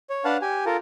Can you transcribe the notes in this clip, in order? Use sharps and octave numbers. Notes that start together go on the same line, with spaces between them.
C#5
D4 B4 F5 F#5 A5
G4 G#5
F4 A4 A#4